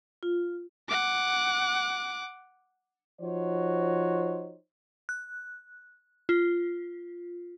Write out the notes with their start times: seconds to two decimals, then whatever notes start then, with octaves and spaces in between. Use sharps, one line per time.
0.23 F4
0.88 F#5 D6
3.21 F3 D#4 F#4 C5 C#5
5.09 F#6
6.29 F4